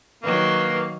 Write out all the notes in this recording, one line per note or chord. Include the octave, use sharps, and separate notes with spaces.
D#3 F#3 A#3 B4